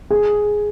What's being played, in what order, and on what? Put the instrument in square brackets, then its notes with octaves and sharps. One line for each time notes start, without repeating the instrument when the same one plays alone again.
[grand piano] G#4